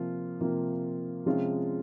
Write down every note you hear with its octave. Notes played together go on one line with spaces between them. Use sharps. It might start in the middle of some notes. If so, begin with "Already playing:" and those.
Already playing: C3 F3 A#3 F4
C3 F3 A#3 F4
C3 F3 G#3 C#4 F4